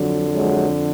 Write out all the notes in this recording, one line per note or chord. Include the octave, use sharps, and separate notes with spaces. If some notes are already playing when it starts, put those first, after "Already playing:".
Already playing: F2 D3 F#3
F#3 G#3